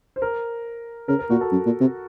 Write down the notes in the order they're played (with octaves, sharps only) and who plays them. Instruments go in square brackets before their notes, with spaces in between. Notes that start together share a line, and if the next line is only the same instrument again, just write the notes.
[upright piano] C5
A#4
[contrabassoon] C#3 [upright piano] A#4
[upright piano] A#4
[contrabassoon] A#2 [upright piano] F#4
[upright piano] A4
[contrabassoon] F#2
A#2
C3